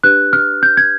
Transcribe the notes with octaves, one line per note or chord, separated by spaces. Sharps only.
D4 G4 B4 F#6
F6
G6
G#6